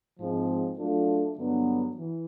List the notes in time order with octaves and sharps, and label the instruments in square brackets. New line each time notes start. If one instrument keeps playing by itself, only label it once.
[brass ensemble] G#2 F3 G#3 C4
F#3 A3 D4 F4 A4
G2 D3 F#3 B3
E3